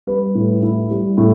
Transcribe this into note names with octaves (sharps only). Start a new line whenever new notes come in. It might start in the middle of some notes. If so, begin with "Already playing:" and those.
G3 B4
A2
E4
G3
A2